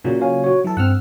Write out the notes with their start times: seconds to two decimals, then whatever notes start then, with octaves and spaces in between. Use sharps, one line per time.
0.04 A#2 C#3 F#3
0.21 C#5 F5 G#5
0.44 F#4 C#5
0.64 E3 F#3 A4
0.77 G2 C4 F#5 E6 F6